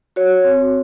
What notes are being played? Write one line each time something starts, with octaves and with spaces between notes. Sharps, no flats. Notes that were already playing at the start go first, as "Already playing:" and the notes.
F#4 C#5
C4